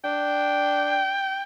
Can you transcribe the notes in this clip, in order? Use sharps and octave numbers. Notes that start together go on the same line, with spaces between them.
D4 G5